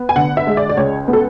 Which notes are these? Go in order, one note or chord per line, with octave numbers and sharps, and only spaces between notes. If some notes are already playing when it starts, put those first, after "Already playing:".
Already playing: B3
G#5
D3 F#5
E5
G#3
D5
D5
C#2 C#5
B3
A4